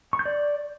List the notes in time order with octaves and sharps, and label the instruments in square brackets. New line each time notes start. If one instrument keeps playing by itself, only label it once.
[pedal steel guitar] C#6
G6
D5